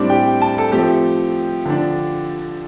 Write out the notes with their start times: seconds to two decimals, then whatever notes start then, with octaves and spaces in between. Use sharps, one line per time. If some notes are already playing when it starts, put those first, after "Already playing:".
Already playing: A2 G3 C4 D4 D5
0.10 G4 G5
0.42 A5
0.58 A4 A5
0.72 F3 A3 C4 G4 G5
1.65 D3 F3 D4